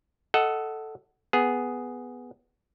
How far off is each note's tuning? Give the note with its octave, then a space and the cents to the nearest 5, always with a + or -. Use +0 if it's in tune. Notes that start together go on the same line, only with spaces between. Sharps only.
A4 +0 D#5 +15 F#5 +10
B3 +0 G#4 +0